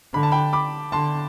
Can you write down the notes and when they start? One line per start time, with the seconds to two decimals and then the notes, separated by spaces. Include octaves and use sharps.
0.13 D3 B5
0.23 A5
0.32 G5 B5
0.53 B5 D6
0.92 D3 A5 C6